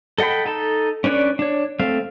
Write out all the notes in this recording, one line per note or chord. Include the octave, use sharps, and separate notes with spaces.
A4 D#5 F#5 G5 B5
D#4 A4 A5
C#4 D4 B4 C#5 D5
D4 C#5
A3 C4 F5